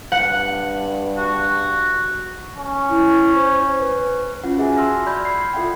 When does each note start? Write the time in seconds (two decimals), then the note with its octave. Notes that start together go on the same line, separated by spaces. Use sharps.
0.12 G2 F#5
1.18 F#4
2.58 C#4
2.90 E4
3.35 C5
3.80 B4
4.44 C#4 F4 F#5
4.57 F#4 G#4 E5 F#5 G#5
4.77 A5 C6 E6 F6 A#6
5.06 D5 B5 F6 G6 G#6
5.25 B5 G#6 C7
5.53 F4 A4 E5 F#5 G5